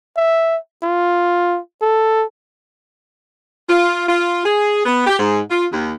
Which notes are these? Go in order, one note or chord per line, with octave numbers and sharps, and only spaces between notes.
E5
F4
A4
F4
F4
G#4
B3
G4
G#2
F4
D#2